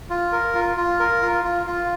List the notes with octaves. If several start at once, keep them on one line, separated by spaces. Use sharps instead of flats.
F4
A#4
F4
F4
A#4
F4
F4
F4